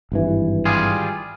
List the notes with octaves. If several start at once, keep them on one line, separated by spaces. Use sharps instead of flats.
G#1 G2 E3
G3 F4 G#4